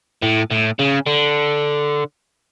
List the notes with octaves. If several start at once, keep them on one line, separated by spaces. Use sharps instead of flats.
A2
A2
C#3
D3